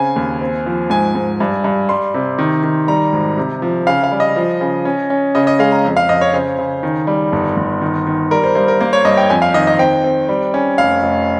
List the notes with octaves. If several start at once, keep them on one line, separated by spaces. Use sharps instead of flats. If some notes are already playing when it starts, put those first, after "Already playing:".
Already playing: C#3 C4 G#5
D#2
C4
F3
G#2 G#5
G#2
G2
G2
G3 C6
C3
D#3
D#3
G3 A#5
G#1
C3
F3
C#3 F5
F5
G3
D#5
F3
C#3
C#4
C#4
C#3 D#5
D#5
G#3 F5
A#5
F2
F5
F2 D#5
C#5
C#3 C5
C#3
D#3
G3
G1
G1
D#3
D#3
G3 A#4
C5
G2 C5
A#4
A#3 C5
C#5
G2 D#5
G5
F2 G#5
F5
D#3 D#5
D#5
C4 G5
C4
G3
C#4
F1 F5
F1